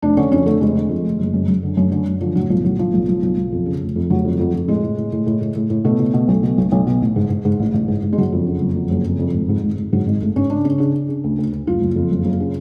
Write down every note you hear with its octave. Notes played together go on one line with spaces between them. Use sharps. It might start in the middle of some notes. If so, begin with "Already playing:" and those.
F1 D4
D3 C#4
F2 C#4
D3 A3
F1 G#3
D3
F2
F1
F#1
F#2
F#2
D3
F#2 A3
D3 A3
F#2
D3 F3
A2 F#3
B1 F3
A2 F#3
B1 F3
B1
B1
B1
B1
F2
C#3
F1
F2
F1 F#3
F2
F2
F2
A2 G#3
A2
A2
A2
A2
A2
A2
A2
B2 A3
B2
B2
B1
B2
B1
B1
B2
A1
G#2
G#2
G#2
A1
A1
G#2
G#2
G#3
F#1 F#3
F2
C#3
F#1
F2
F#1
F2
F2
G#1
G#2
G#1
G#1
G#2 F#3
G#1 G#3
G#1 A3
G#2 C#4
C#3 D4
C#3 C#4
C#3 D4
C#3
C#3
D2
D2
D2
F#1 F4
F#1
F2
F#1
F#1
C#3